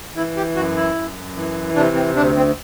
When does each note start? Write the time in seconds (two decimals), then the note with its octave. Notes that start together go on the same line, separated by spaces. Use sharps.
0.16 E3 E4
0.36 G4
0.56 F#2 F#4
0.76 E4
0.95 F#2
1.36 E3
1.75 C3 D4
1.95 C4
2.16 D2 D4
2.36 C4